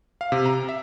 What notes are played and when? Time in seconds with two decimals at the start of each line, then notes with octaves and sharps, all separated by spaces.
0.21 F5
0.32 C3
0.46 A#5
0.69 E5